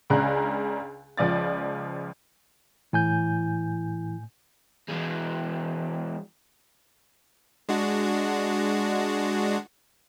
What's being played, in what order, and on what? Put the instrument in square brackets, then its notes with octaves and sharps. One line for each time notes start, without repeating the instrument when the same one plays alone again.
[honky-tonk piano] C#2 C#3 D4 A#5 F#6
C#2 F3 D5 A6
[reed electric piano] A2 G#5 G6 [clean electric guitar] E3
[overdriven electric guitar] E3 G#3
[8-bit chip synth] G#3 D4 F#4